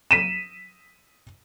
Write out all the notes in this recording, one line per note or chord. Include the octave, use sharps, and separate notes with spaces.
B6 D#7 E7